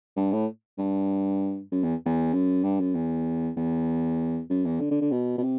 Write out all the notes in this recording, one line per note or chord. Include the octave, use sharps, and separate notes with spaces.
G2
A2
G2
F#2
E2
E2
F#2
G2
F#2
E2
E2
F#2
E2
D3
D3
D3
B2
B2
C3